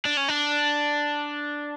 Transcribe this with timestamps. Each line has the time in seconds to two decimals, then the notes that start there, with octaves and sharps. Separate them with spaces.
0.05 D4
0.17 C#4
0.28 D4